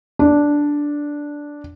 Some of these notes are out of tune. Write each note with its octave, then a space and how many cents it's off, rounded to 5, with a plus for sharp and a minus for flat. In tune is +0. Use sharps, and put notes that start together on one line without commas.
D4 -5